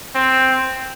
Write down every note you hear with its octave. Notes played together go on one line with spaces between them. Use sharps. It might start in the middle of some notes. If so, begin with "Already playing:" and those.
C4